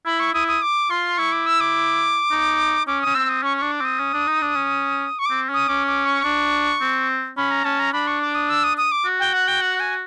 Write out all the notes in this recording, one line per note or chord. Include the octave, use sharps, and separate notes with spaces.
E4 B5
C#6
E4 D#6
D#6
D6
F4 C6
E4 C#6
D6
E6
D6
D#4
C#4 D6
C#4 D#6
C4 E6
D#6
C#4 C#6
D4 C#6
D6
C4 D#6
C#4
D4
D#4
D4
C#4
C#6
C4 D6
C#4 D#6
C#4 D6
D6
C#6
D4
C4
C#4 B5
A#5
C#4 A5
A#5
D4 B5
C#6
D6
D#6
E6
D#6
D#6
D6
F#4
G5
F#5
G5
F#5
G#5